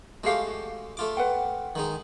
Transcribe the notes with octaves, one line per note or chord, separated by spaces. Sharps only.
G#3 A3 F#4 G4 F5
F#4
A3 F4 D6
B4 F#5 G5
D#3 G#3 D#4